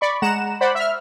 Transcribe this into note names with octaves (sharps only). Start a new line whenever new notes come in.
D5 B5 C#6
G#3 F#5 A#5 E7
C5 D5 F#5 B5
E5 F6